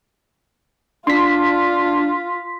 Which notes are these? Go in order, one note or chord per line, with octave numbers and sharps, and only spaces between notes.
D4 F4 C6 B6